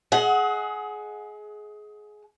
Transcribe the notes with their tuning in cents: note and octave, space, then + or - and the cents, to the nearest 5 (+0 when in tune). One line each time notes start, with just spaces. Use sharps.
G#4 +20 D#5 +40 F#5 +0